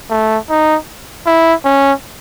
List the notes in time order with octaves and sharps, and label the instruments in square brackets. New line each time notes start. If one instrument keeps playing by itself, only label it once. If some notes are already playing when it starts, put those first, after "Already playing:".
[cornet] A3
D#4
E4
C#4